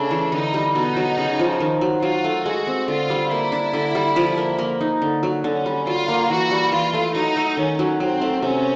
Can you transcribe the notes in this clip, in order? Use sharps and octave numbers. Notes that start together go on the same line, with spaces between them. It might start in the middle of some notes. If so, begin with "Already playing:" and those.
Already playing: C#3 A3 D4
E3
D3 D#4
G3
B2 D#4
F#3
C#3
F3
D#3
F#3
F#3 F4
A3
G#3 F#4
C4
D3 F4
G3
A#3 E4
D4
D3
G3
F3
A#3
A#3
D#4
D3
F#3
D3 C#4
G3
F#3 F4
A#3
E3 F#4
G3
E3 F4
A3
F#3 D#4
A3
D#3 C#4
F#3
F#3 C4
A3
C3 C#4